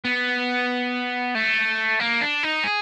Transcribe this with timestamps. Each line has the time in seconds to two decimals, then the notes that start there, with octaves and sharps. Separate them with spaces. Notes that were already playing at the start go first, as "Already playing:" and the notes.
0.05 B3
1.35 A3
2.00 A#3
2.21 D4
2.43 D#4
2.64 G#4